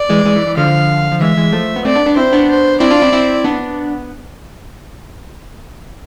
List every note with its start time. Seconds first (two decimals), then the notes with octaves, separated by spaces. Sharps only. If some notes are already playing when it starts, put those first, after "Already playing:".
Already playing: D5
0.09 E3 G#3
0.25 E3 G#3
0.36 E3
0.47 E3
0.57 D3 F3 F5
1.12 F3
1.21 E3 G#3 E5
1.37 E3 G#3
1.52 F3 A3
1.76 B3
1.85 A3 C4 D5
1.95 B3 D4
2.06 B3 D4
2.16 C4 E4 C5
2.33 B3 D4
2.49 C5
2.80 C4 E4 D5
2.91 D4 F4
3.02 C4 E4
3.12 C4 E4
3.44 B3 D4